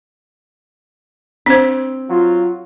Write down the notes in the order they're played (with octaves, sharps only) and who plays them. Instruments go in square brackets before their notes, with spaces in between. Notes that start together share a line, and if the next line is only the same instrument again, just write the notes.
[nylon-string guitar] C4 [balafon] D4 C5
[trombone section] F#3 F4